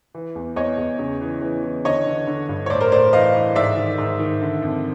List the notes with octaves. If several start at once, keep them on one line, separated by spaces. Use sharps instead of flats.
E3
E2
E2 C#5 D#5
E2
C#3
E3
E3
E3
D3 C#5 D#5
D3
D3
G2
C#5
A2 C5 D5
A#4 C5
A2 C5 D5
E3 D#5 F5
E3
G#2 D5 E5
D#3
G#2
D#3
D3
F2